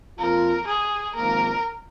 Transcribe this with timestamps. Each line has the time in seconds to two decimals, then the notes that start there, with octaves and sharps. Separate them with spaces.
0.19 F2 F3 A#3 F4 A#4
0.68 G#4
1.16 G#1 G#2 F3 A#3 A#4